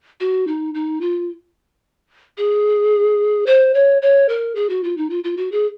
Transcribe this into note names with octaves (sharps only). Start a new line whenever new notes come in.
F#4
D#4
D#4
F4
G#4
C5
C#5
C#5
A#4
G#4
F#4
F4
D#4
F4
F4
F#4
G#4